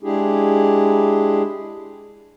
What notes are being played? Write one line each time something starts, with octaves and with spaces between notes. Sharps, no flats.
G#3 D4 E4 G4 G#4